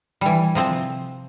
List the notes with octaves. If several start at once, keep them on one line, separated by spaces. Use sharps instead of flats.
E3 G3
C3 F3 C4